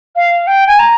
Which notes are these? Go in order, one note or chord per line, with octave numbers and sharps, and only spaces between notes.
F5
G5
G#5
A#5